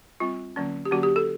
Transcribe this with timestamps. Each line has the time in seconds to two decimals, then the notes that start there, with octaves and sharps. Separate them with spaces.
0.20 G3 C4 F4
0.56 D3 F#3 A#3 C#4
0.85 G4
0.91 D3 F#3 A#3 C#4 F#4
1.03 G4
1.16 A4